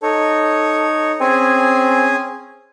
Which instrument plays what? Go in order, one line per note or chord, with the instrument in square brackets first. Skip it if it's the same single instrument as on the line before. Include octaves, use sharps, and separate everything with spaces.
[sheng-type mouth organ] D#4 C#5 [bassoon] A4
[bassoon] C4 [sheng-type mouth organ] C#4 G#4 G#5